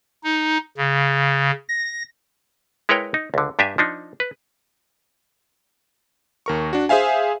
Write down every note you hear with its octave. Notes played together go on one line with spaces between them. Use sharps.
D#4
C#3
A#6
G#3 E4 A#4 B4 C#5 G5
D#4
C#2 D3
G2 D4 G4 E5 G#5
F3 D4 D#4
B4
D#2 A#4 C#6
D4 F#4
G#4 C5 E5 F5 G#5